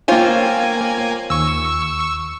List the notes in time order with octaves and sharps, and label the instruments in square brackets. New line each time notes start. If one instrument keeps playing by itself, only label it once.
[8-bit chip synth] A#3 G#5 [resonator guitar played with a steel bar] F4 C5 [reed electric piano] C#5 F5 G5
[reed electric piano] D#2 [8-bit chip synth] C#6 E6